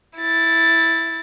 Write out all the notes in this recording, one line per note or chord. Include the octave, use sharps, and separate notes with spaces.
E4 A6